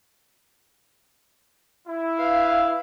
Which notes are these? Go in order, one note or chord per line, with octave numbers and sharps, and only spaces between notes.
E4
B4 F5